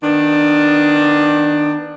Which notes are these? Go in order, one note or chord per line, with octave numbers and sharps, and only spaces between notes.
D#3 B3 D4